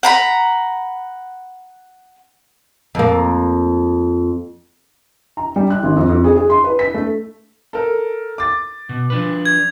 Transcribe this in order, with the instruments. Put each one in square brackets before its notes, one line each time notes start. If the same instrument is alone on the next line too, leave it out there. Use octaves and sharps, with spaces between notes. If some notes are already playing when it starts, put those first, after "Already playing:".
[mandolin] F#5 A#5 B5
[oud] F2 A#3
[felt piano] A#5
G3
F#6
G#1
F2
F2
G#4
G#4
C6
B4
B6
A3
[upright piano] A4 A#4
D6 A6
[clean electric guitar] B2
F3 D4 B4
[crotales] G#6